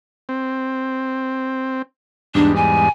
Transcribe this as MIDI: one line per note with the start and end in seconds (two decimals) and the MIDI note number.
0.29 1.82 60
2.35 2.89 40
2.35 2.89 44
2.35 2.89 55
2.35 2.54 62
2.56 2.89 80